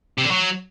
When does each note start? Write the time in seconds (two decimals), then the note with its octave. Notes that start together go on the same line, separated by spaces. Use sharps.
0.18 C3
0.24 D3
0.31 F#3